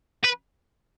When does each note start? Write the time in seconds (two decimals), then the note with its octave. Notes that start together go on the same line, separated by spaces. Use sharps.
0.24 B4